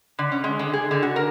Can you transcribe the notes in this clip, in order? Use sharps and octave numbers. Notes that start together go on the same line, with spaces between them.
D3
C#4
G#3
D3
G#4
D3
F#4
A#4